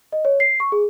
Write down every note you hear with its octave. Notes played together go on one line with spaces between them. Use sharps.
D#5
C#5
C7
C#6
G#4